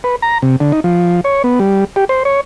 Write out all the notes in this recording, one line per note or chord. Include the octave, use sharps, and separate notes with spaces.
B4
A#5
C3
D3
D#4
F3
C#5
B3
G3
G4
C5
C#5